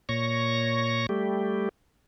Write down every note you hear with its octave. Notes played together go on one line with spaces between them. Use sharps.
A#2 C#5 C#6 A#6
G3 A3 G4